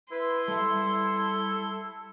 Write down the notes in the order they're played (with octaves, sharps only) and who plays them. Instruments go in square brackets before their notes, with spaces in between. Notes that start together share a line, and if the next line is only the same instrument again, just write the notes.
[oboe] E4 [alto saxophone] B4 [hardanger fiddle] C6
[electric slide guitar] G3 E5 [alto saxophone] A4